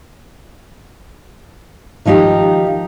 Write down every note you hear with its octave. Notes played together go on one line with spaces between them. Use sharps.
D#3 F3 D#4 G4 F5